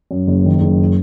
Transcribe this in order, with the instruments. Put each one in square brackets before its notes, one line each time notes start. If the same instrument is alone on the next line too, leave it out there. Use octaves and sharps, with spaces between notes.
[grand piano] F#2
F#1
D#3
F#1